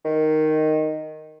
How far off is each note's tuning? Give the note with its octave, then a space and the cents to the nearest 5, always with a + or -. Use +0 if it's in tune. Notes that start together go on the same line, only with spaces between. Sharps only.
D#3 -5